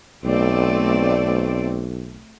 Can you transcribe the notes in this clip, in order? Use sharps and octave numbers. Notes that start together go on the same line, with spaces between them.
B1 A3 C4 D5